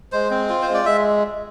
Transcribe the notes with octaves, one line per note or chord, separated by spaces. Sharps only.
G#3 C5
C4
F4
C5
G#3
D5
G#3 E5